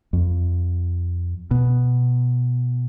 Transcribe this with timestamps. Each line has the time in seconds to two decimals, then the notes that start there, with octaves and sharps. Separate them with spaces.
0.13 F2
1.51 B2